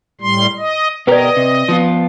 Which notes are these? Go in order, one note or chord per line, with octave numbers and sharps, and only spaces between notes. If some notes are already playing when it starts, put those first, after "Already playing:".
A2 G3 C6
D#5
B2 G4 A#4 B4 D5 D#5
C3
F3 B3 F4